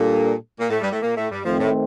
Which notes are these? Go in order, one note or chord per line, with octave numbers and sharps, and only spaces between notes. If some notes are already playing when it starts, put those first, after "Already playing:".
Already playing: A#2 G3 A#3 D4 A4
A#2 A#3
A2 A3
G2 G3
A2 A3
A#2 A#3
A2 A3
G2 G3
F2 D#3 F3 A3 C4
A2